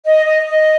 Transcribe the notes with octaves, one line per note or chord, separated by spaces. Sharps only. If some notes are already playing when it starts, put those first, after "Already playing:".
D#5
D#5
D#5